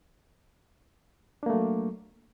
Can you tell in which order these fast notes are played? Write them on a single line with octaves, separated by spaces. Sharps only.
D4 A#3 A3 F#3